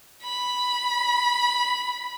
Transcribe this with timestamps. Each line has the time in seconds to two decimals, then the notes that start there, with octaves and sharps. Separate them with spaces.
0.23 B5